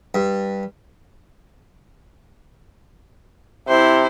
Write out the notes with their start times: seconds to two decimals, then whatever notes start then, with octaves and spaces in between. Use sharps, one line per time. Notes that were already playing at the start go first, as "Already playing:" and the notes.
0.15 G2
3.68 C3 E4 C5